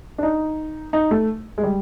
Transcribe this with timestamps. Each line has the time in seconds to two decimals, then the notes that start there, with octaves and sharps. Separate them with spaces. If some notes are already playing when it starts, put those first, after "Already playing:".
0.18 D4
0.23 D#4
0.93 D#4
1.11 A3
1.58 G#3
1.64 G3